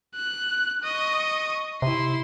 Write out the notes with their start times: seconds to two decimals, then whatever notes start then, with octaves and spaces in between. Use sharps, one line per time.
0.15 F#6
0.83 D#5 C#6
1.82 C3 E4 C6